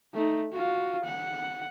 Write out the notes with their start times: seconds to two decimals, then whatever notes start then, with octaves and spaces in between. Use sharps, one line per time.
0.14 A3 D#4
0.52 F4 F#4
1.05 F#5